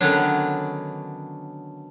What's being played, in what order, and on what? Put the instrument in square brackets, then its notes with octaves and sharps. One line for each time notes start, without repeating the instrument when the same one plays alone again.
[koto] D3 D#3 F#3 B3 C#4 D4